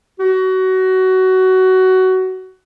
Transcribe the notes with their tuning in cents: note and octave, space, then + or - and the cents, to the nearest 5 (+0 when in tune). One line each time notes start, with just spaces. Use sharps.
F#4 +20